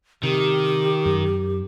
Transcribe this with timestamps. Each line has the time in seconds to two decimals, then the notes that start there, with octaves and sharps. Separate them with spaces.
0.23 C3 D#3 G4
1.06 F#2